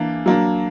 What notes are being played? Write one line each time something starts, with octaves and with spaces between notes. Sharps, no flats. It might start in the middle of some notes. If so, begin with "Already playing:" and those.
Already playing: E3 A#3 D4
F#3 A#3 D4